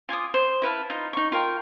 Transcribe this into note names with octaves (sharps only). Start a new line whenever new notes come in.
F4 G#5 D6 D#6
C5
E4 B4 F5 A5
D#4 F4
D#4 C#6
F4 A#4 G5